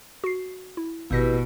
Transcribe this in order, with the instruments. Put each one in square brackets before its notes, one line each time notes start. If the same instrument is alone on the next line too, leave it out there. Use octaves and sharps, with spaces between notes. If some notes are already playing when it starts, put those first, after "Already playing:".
[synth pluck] F#4 C7
E4
[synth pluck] G#1 A#6 [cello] B2 [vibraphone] E4 G4 B4